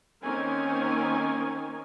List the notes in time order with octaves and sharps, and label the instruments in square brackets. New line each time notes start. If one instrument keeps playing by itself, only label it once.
[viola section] D#3 A#3 C4 C#4 A#4 G#5